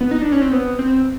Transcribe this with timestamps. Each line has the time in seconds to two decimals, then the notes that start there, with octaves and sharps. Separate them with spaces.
0.01 B3
0.11 D#4
0.21 D4
0.32 C#4
0.42 C4
0.52 B3
0.79 C4